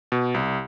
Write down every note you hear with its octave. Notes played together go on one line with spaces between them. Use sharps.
B2
C2